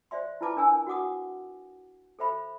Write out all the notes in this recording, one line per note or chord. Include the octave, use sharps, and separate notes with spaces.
C5 D5 E5 C6
E4 F4 B4 A5 D6
D4 A#4 B4 G#5 E6
F#4 F#5 D6 D#6
A4 C5 E5 B5